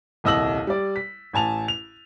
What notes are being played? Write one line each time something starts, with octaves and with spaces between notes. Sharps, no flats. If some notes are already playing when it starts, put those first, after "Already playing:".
D#1 C2 D#5 E6 F#7
G3 D5
B6
A1 G#5 A5 F7
F7